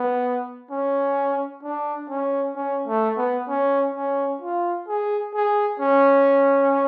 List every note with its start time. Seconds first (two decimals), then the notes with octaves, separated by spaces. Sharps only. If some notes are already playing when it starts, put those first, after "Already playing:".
Already playing: B3
0.71 C#4
1.63 D4
2.09 C#4
2.56 C#4
2.87 A3
3.17 B3
3.48 C#4
3.94 C#4
4.42 F4
4.88 G#4
5.34 G#4
5.80 C#4